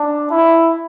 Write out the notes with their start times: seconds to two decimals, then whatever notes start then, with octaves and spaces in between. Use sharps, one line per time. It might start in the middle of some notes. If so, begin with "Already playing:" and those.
Already playing: D4
0.30 E4